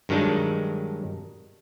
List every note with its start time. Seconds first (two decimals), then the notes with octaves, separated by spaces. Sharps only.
0.09 G2 D#3 F#3 G#3 D4 D#4